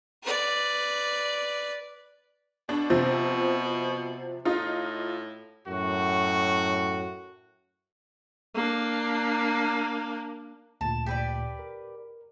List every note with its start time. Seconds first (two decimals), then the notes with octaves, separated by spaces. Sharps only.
0.23 B4 D5
2.69 B2 D4
2.90 C3 F3 C4
4.45 A2 D#4 F4
5.65 F#2 A2 F#4
8.55 A#3 D4
10.81 D2 A#2 A5
11.06 G4 B4 D5
11.59 A#4